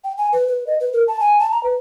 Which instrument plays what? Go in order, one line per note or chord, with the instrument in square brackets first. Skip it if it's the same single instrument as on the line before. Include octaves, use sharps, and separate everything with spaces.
[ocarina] G5
G#5
B4
B4
D#5
B4
A#4
A5
G#5
A5
A#5
B4